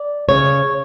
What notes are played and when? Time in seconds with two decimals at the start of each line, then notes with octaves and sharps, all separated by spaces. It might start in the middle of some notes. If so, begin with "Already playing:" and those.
Already playing: D5
0.29 C#3 C#5